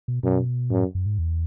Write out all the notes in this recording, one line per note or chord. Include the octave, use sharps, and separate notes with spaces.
B2
F#2 B2
F#2 A2
F#2
G#2
E2